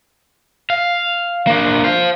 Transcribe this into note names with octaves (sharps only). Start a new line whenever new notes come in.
F5
A#3 D4
C5 F5